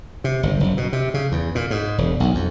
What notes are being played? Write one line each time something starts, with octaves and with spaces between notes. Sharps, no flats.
C3
G1
F#1
B2
C3
C#3
E2
A#2
G#2
E1
B1
F2